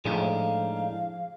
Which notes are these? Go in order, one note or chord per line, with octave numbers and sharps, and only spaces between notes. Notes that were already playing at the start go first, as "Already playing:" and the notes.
A2 F3 G#3 D4 D#4 G#4 C5 F5